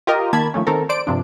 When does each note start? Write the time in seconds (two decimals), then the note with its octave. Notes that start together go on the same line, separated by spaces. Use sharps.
0.07 F4 G4 A#4 D#5
0.33 D#3 A#3 A5 B5 G#6
0.54 D#3 F3 A3 C#4
0.67 D#3 C4 A4 A#4
0.89 C5 D5 D7
1.07 G2 C3 F3 D4